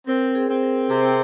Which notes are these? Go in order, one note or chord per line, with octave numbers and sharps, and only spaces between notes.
C4 A#4
G#4
C4
A#4
C3 G#4